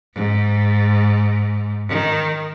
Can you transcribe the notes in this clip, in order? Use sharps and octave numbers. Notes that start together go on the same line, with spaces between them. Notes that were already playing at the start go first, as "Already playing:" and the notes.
G#2
D#3